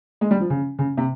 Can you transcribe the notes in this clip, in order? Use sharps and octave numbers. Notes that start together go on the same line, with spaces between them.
G#3
G3
F3
C#3
C#3
C3